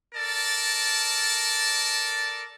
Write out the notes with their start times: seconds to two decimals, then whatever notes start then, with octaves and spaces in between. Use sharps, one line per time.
0.14 A4 A#4 D5 A5